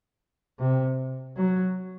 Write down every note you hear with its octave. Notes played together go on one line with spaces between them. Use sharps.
C3
F#3